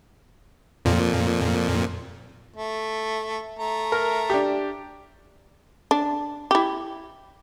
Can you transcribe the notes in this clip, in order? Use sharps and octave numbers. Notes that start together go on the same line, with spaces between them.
F2 A#2
A3
A3 A#5
A#4
D4 G4
D4
E4 G4